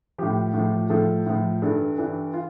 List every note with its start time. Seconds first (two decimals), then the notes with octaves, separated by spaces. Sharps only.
0.18 A2 F3 G4
0.54 A2
0.59 F3
0.90 A2 F3 A4
1.26 A2 F3
1.62 G2 E3 A4
1.98 G2 E3
2.34 F4